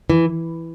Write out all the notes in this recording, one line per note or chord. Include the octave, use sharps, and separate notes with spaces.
E3